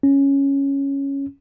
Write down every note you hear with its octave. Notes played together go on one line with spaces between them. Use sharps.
C#4